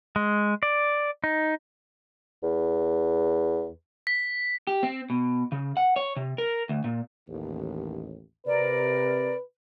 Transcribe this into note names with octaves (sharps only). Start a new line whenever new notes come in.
G#3
D5
D#4
E2
B6
G4
C4
B2
C#3
F#5
C#5
C3
A#4
D2
A#2
A1 D#2
C3 A#4 B4 D5